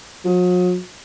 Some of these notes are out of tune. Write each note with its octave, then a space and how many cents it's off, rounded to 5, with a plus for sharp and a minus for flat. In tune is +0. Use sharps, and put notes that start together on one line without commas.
F#3 -45